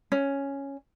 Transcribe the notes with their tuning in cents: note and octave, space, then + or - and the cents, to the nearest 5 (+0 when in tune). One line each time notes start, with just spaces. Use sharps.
C#4 +0